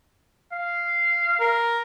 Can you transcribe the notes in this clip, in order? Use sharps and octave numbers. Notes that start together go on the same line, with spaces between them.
F5
A#4